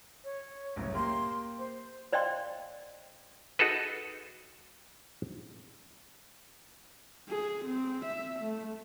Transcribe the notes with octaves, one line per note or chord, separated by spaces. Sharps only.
C#5
F#1 C2 A2
A#3 G4 A#4 C6
C5
C5 D5 D#5 F5 G5 C6
D#4 F#4 G#4 A4 B4
G#4
C4
E5
A3